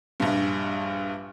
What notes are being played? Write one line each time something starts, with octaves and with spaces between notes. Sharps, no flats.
A#1 G2